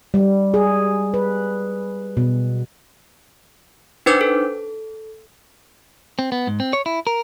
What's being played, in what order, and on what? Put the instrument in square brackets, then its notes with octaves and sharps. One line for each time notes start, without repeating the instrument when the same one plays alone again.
[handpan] G3
G#4
B4
B2
[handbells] D4 D#4 B4 C5 D6 G6
A4
[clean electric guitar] C4
B3
G#2
C4
C#5
E4
A#4